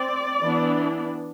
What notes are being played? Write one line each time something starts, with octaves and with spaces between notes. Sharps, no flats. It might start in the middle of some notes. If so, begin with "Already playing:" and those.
Already playing: C4 D5
E3 B3 D4